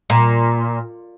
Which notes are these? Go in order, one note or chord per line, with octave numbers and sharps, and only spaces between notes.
A#2